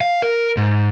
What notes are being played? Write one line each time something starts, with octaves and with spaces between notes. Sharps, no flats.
F5
A#4
G#2